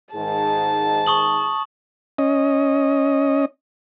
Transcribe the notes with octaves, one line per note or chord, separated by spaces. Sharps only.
G#2 D#3 G#4 A5
C#6 D#6 F#7
C#4 D#5